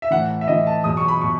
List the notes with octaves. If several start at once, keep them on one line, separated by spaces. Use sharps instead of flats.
E5
A2 E3 F#5
E5
A2 E3 D#5
A5
E2 B2 F#3 D#6
C#6
B5
B2 C#6